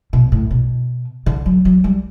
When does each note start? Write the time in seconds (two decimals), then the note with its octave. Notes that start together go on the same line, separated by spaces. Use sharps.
0.13 B2
0.32 A2
0.51 B2
1.26 D3
1.46 F#3
1.65 F#3
1.84 G3